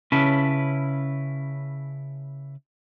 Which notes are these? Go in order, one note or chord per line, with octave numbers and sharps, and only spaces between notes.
C#3 C#4 E4 B4 A5